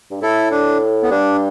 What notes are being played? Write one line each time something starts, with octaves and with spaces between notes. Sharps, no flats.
G2
A2 E4 A4
D4
B3
G2 D4